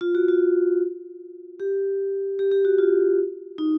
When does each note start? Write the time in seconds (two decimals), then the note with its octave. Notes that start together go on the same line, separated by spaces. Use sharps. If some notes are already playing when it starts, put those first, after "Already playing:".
0.01 F4
0.15 F#4
0.28 F4
1.60 G4
2.39 G4
2.51 G4
2.65 F#4
2.78 F4
3.58 D#4